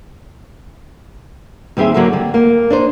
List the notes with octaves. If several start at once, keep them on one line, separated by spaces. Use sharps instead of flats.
D#2 G3 C4 G4 G#4 E5
D3 F#3 A#3 F#4 A4
G3
A#3
D4 D#4 C5